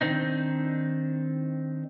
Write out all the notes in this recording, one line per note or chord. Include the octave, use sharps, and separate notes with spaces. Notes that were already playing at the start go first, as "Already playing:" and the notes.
D#3 C4 D4 D#4